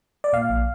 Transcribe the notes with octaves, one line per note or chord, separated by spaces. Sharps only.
D5
A#2 F5
A#1